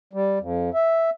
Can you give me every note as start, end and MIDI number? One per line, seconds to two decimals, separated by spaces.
0.13 0.39 55
0.40 0.70 41
0.74 1.10 76